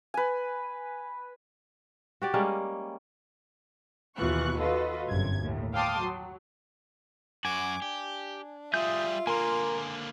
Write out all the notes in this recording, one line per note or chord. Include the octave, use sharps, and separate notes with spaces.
B4 G#5
F#4 G4 D5
G3 G#3 A#3 C#4
D#2 B2 E3 F4 C#6 F#6
F4 F#4 A4 B4 D#5
G1 F#2 C3 G#6
D#2 A2
F5 G5 A5 C6 D6 D#6
F#3
F#2 F#4 G#5 D6
D4 G4
G3 F4 G#4 E5 D#6 G6
D3 A#3 A#4 G#5 C6